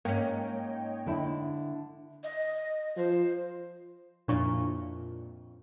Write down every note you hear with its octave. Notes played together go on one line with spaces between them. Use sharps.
G#2 A#3 C#4 C#5 D#5 G5
D3 E4
D#5
F3 C5
F2 A#2 D4 E4 C#5 C#6